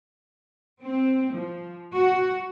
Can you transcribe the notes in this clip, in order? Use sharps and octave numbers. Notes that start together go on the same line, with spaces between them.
C4
F3
F#4